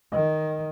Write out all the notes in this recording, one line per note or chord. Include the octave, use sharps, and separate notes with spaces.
D#3 D#5